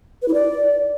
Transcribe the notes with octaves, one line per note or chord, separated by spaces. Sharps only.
B4
E4
D5